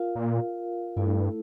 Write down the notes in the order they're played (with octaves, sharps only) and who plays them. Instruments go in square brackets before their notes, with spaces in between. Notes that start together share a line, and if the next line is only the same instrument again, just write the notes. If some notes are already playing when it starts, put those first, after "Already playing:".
Already playing: [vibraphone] F4 A#4 F5
[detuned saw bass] A#2
[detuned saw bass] G2 [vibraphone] A3 E4 A4